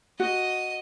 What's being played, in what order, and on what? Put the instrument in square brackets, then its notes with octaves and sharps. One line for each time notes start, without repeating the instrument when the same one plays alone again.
[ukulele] F#4 [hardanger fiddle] D#5